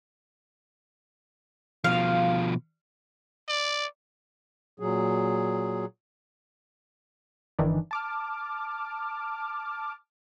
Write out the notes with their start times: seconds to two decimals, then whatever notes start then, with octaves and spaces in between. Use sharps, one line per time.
1.84 B2 F3 F5
3.48 D5
4.80 A#2 F#3 G#4
7.59 G1 D#3 E3 D4
7.91 A5 D6 F6